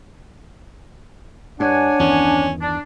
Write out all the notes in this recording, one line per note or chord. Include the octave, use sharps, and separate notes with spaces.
G2 D4 C#5 F#5 G#5
E2 G2 D#3 C#4
D4